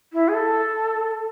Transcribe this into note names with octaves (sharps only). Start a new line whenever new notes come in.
E4
G#4
A4